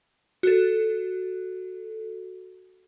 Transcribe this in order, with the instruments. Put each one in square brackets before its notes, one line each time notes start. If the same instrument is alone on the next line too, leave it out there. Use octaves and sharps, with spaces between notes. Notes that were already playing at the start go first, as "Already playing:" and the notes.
[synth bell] F#4 A4